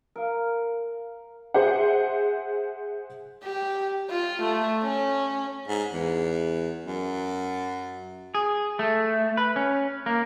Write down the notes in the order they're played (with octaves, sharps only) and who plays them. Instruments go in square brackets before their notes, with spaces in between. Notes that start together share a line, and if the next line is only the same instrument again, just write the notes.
[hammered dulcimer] A#4 F5
[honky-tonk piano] G#4 C5 E5 F#5
[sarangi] G4
F4
A3
C#4
[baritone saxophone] G#2
E2
F#2
[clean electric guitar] G#4
A3
B4
C#4
A#3